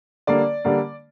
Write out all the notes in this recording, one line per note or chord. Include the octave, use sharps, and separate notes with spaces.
D3 G3 A#3 D5
D3 G3 A#3